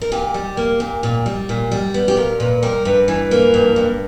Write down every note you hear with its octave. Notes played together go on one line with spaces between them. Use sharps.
A#4
A#2 G4
G3
A#3
A#2
A#2
G3
A#2
G3
B3
G4
A#2 A#4
A#2 B4
G3 A#4
G2 B4
E3
A#3
G2
G2